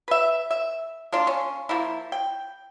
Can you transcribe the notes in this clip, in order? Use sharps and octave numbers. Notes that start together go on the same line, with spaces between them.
B4 E5
E5
A#3 D4 F4
C#4
F3 A#3 E4
G5